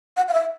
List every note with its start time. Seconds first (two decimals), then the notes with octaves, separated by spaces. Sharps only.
0.17 F#5
0.28 F5
0.33 E5